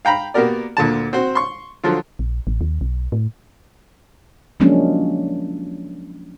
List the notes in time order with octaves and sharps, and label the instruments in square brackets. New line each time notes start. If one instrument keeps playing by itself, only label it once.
[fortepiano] F5 G5 A#5 B5
A#3 B3 F#4 G4 A#4 D5
D2 A#2 D3 A5
C4 F#4 C5
C6 C#6
D3 F3 F#3 F4
[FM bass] A#1
A1
D#2
B1
A2
[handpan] F3 F#3 G#3 A#3 C#4 D4